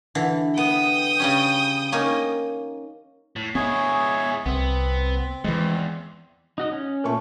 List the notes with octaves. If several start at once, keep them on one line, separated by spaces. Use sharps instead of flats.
D3 E3
B3 G5 D#6
C#3 G3 C#4
A#3 C#4 D#4
A2
G#3 B3 E4 G#4 C#5
C2 B3 C4
E2 E3 G#3
D#4 F#4 D#5
C#4
A#2 A3 C#6